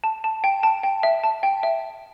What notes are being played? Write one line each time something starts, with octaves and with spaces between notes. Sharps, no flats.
A5
A5
G5
A5
G5
E5
A5
G5
E5